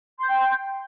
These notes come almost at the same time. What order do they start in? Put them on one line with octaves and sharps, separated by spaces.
C6 G6 G5